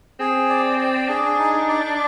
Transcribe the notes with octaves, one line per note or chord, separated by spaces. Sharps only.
C4 G#4
D5
D5
D4 G#4
D#4
D5